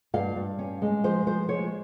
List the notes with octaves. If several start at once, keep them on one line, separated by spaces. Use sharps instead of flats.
G2 F5
G2
C#4
G#3
F3 C5
F3 C5
G#3 C#5